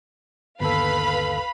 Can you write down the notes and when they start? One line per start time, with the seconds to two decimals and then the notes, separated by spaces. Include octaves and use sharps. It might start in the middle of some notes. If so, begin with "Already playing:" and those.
0.60 G1 D#2 A4 B4 F5 B5